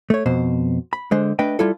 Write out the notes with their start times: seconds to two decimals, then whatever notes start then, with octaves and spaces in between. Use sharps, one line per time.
0.10 A3 C#5
0.26 F2 B2 C5
0.93 B5
1.11 D3 G#3 C5
1.39 A3 D4 B4 D#5 G5
1.59 G3 E4 F4 A4